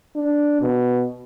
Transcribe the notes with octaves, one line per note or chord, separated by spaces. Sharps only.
D4
B2